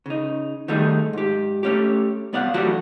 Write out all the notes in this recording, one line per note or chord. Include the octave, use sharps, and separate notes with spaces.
C#3 D#4
D#3 G3 A3 D#4 G#4
G#2 G4
A3 C#4 G4
C2 B3 D5 F5 F#5
E3 F#3 A3 D4 F#4 G4